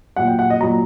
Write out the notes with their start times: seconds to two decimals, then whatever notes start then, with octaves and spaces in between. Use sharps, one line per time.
0.16 A#2 F#3 F#5
0.28 G5
0.39 F#5
0.50 D#5
0.61 A#2 F#3 A#5